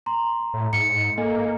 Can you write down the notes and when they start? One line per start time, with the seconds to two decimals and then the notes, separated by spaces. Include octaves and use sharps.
0.06 A#5 C6
0.54 A2
0.73 G#2 C#7
1.18 A#3 A4 D#5 G#5